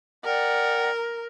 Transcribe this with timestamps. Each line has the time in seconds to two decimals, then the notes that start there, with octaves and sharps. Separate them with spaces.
0.24 A#4 D5 F#5 G5